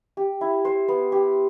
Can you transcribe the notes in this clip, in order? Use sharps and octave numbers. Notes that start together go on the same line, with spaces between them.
G4
E4
C5
B3
G4